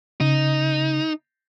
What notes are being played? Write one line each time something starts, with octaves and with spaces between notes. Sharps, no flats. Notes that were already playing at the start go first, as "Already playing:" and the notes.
C#3 D#4